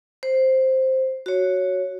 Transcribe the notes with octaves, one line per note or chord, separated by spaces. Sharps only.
C5
F#4 C#5